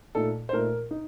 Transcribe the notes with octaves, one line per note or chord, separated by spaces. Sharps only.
A#2 A3 D#4 A4
C5
A#2 A3 D#4 A#4
D#4